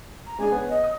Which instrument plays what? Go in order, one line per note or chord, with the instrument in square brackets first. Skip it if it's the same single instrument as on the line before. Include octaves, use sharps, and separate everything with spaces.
[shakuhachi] A#5
[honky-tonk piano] G#3 D4 G#4 [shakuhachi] G#5
[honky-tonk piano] B3 C#5
[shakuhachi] D#5
[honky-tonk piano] D#6